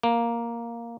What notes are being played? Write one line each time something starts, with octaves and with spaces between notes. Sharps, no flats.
A#3